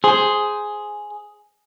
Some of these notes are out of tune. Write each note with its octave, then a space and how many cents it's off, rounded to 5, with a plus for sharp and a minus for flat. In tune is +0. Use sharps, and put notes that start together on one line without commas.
G#4 +5 C5 +0